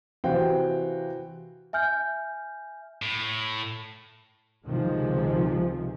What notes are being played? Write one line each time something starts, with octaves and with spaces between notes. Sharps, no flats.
C3 E3 F#4 C5 F5 G5
E5 G#5 F6 G6
A2
C#2 C3 D#3 F3 G#3